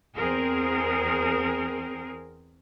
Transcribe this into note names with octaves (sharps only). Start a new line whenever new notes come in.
E2 C4 G#4 A#4